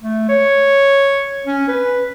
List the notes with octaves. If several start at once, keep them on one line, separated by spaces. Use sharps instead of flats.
A3
C#5
C#4
B4